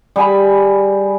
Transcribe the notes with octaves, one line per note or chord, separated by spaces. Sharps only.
G3 G#4 G#5 B5